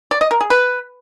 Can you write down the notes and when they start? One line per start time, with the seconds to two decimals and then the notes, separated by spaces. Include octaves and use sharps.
0.11 D5
0.21 D#5
0.31 A#4
0.41 G#4
0.50 B4